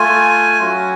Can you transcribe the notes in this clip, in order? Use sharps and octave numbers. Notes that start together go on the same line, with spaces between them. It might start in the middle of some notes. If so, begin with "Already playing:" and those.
Already playing: A3 F4 G#5
F#3 C#4 F#4